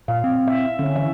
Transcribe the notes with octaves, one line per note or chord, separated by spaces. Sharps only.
A#2 F5
C4
E5
D3 C#4
E3 E5